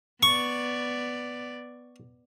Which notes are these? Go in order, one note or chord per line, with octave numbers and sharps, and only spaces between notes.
B3 D5 C#6